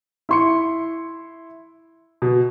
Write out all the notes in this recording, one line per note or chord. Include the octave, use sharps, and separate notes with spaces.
E4 C6 C#7
B2